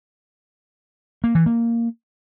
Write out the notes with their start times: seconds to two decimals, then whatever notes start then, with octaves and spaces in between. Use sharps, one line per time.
1.24 A#3
1.35 E3
1.46 A#3